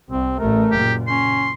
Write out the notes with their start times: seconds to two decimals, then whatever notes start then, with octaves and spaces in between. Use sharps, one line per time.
0.10 C2 C4
0.39 A1 A3 A#4
0.71 F#1 A#2 G4
1.07 C#4 C6